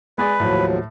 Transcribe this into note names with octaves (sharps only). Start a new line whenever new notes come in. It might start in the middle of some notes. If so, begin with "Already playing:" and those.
G#3 G#4 B4 D5
D#2 A2 F3 F#3